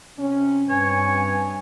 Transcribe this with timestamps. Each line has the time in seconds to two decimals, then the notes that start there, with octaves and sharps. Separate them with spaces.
0.18 C3 C#4
0.69 G2 C4 B4 C#5 G#5